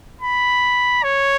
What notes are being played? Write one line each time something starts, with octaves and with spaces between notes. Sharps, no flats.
B5
C#5